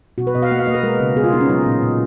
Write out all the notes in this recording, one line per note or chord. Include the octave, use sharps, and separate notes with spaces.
B2 F#4
B4
B2 D#5
F5
A#3 F#5
F5
A#3 D#5
B4
G#3 A#4
C#3
B3 G#4
F4
B3 D#4
C#4
F#3 D#4
A#2
A#2